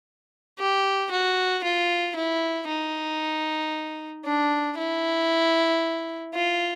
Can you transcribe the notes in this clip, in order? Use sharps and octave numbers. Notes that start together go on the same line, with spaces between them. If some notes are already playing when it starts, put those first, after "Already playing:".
G4
F#4
F4
E4
D#4
D4
E4
F4